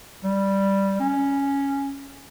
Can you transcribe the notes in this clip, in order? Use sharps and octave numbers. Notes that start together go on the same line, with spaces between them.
G3
C#4